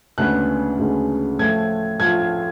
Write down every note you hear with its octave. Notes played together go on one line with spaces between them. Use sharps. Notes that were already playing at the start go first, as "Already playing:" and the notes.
D2 C#3 G#3 B3 D4 F#6
D2 C#3 G#3 B3 D4
A2 F3 A3 F4 G#6
A2 F3 A3 F4 G#6